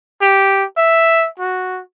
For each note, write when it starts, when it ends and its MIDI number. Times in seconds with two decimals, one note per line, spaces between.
0.22 0.65 67
0.77 1.28 76
1.40 1.81 66